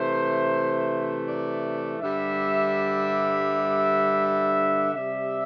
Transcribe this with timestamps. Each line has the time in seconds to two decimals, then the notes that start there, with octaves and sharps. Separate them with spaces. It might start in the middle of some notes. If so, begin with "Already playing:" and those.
Already playing: C3 E3 A3 C5
1.27 D5
2.00 G2 D3 G3 E5
4.94 C3 G3 E5